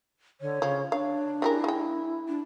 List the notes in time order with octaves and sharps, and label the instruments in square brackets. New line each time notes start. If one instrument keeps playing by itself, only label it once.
[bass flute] D3 [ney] C#5
[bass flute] C#3 [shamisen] F3
[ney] D4 [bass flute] C#5 [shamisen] F5
[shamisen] C#3 G4 A#4 [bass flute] E4
[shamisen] G#3 G5
[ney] D4